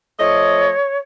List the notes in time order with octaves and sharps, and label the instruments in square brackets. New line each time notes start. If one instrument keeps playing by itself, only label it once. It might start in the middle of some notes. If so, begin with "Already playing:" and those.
[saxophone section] F3 A3 D#5 [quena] C#5